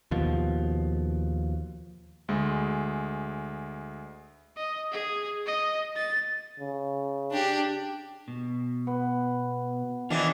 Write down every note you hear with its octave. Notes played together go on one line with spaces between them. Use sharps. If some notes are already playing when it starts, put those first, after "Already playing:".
D#2 B2 F3
D2 G#3
D#5
G#4
D#5
A6
C#3
D4 G4
B2
B3
D#3 E3 D4 F4 G#4 C#5